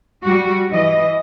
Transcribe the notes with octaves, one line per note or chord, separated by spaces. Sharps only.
G3 F#4
E3 D#5